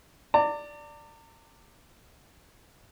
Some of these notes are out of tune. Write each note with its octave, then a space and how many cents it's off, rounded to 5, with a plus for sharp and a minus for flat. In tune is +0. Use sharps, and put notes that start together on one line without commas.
D5 +0 A#5 -45